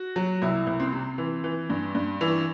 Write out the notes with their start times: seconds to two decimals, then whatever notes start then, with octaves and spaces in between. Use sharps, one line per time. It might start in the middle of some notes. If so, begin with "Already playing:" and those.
Already playing: F#4
0.16 F#3
0.42 C2 E4
0.67 C2
0.80 C4
0.93 C3
1.18 E3
1.44 E3
1.70 G2
1.95 G2
2.21 E3